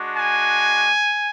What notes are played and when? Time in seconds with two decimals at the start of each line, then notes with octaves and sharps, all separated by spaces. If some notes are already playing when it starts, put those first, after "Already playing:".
Already playing: G#3 D4 F#4
0.16 G#5